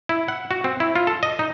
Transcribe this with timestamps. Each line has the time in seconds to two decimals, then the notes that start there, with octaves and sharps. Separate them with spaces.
0.09 E4
0.28 F#5
0.51 F#4
0.64 C4
0.80 E4
0.95 F4
1.07 A4
1.23 D#5
1.39 D#4